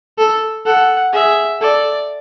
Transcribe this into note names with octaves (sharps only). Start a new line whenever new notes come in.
A4
A4 F#5
G#4 E5
A4 D5